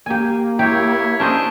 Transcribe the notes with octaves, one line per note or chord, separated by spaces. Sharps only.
A#3 G4 G#5
E4 G4 C#5 E5
C#4 D4 C5 D#5